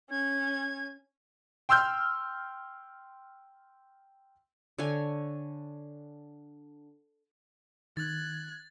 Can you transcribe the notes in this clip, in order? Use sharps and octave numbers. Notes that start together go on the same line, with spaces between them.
C#4 G#6
G5 C6 E6 F6 G6
D3 C#5 G#5
D#3 F#6 G#6 A6